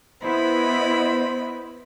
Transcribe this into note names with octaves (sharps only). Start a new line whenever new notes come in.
B3 E4 C5 D#5 B5